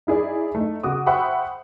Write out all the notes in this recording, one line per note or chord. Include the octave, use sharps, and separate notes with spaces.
D#4 E4 G#4 D5
A3 D#4
C#3 F#4 D6 D#6
C5 E5 F#5 G5 B5 C#6